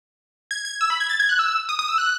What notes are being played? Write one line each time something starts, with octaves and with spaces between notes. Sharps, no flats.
G#6
G#6
E6
B5
G#6
A6
G#6
F#6
E6
D#6
D#6
E6
F#6